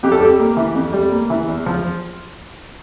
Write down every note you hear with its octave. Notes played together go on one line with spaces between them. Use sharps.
F2 G4
A4
G3 G4
A#3
E3
F2
G3
A#3
E3
E2
F3